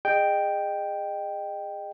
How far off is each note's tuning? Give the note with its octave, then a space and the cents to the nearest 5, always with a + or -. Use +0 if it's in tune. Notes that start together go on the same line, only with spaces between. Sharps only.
G#4 -15 D#5 -25 G5 +0